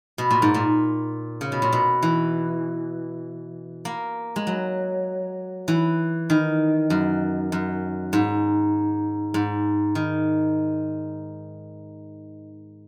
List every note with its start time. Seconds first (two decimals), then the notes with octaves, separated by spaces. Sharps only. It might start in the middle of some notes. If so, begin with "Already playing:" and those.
0.18 B2
0.30 A#2
0.42 G#2
0.54 A#2
1.41 C#3
1.52 B2
1.62 A#2
1.72 B2
2.03 E3
3.85 A#3
4.36 G#3
4.47 F#3
5.68 E3
6.30 D#3
6.90 F#2
7.52 F#2
8.13 G#2
9.34 G#2
9.95 D#3